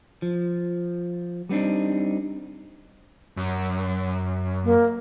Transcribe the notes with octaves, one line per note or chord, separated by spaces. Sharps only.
F3
G3 B3 C4 D4 D#4
F#2
A#3